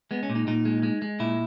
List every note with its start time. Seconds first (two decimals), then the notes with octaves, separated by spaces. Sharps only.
0.11 G#3 B3
0.23 C#4
0.30 A#2
0.35 D#4
0.47 A#2 D#4
0.65 G#3
0.83 G#3
1.02 G#3
1.20 A#2 E4